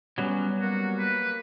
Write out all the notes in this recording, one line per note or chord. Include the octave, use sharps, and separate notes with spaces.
F#3 G3 B3 C#4
A#3 F#4
B4